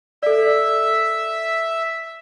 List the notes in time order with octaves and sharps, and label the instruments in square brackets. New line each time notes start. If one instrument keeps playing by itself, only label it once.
[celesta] A4 D5 [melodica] E5 E6